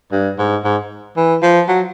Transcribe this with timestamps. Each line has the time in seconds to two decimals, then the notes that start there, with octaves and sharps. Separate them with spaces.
0.12 G2
0.38 G#2
0.64 G#2
1.16 E3
1.42 F3
1.68 F#3